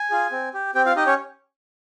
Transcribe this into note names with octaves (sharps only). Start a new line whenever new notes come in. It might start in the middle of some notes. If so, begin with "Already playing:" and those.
Already playing: G#5
F4 G#4
C4
G4
C4 G4 G5
F4 F5
D#4 G4 D#5
C#4 C#5